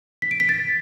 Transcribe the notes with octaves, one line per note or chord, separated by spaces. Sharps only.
B6
D7
B6
A6